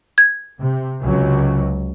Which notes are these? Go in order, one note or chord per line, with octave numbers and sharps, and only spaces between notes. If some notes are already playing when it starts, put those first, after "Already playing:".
G#6
C3
C#2 C3 F#3